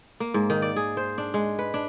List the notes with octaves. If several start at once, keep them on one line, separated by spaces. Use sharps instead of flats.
A#3
G#2
D#3
D5
G#4
C5
D4
G#3
B4
D4